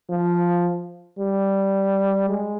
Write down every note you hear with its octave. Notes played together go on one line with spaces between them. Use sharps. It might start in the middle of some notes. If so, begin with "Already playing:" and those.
F3
G3
G#3